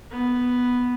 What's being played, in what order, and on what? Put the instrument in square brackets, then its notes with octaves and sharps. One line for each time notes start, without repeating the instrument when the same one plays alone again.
[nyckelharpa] B3